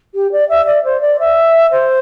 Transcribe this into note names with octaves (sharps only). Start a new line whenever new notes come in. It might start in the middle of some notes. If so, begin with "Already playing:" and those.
G4
D5
E5
D5
C5
D5
E5
C5